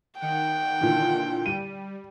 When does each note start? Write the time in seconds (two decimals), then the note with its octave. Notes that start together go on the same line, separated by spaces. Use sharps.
0.20 D#3 F#5 G5
0.81 A#2 D3 E3
1.46 G3 D#7